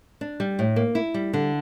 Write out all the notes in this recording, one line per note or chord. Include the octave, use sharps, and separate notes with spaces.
D4
G3
A2
A#3
E4
G3
D3